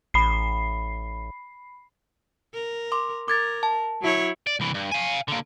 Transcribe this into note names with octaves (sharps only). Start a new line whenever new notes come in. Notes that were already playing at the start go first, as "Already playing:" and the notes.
A1 B5 C7
A#4
C6 D6
A#4 D6 G#6 A6
A5
F#3 E4 C#5
D5
C2 E3
G2
F5 G#5
D3 A#3